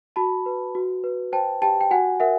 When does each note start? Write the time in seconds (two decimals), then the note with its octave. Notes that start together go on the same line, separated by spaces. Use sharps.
0.16 F#4 A5 B5
0.46 B4
0.75 F#4
1.04 B4
1.32 C5 G5 A5
1.62 G4 G5 A5
1.81 G5
1.91 F#4 F#5 G#5
2.20 A#4 E5 F#5